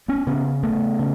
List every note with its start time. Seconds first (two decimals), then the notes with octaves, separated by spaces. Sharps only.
0.08 B3 C#4
0.27 C#3 B3 C#4
0.63 C#3 A3 B3
0.99 C#3